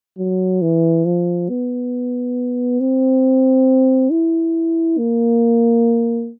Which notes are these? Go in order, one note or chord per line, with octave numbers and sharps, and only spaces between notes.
F#3
E3
F3
B3
C4
E4
A#3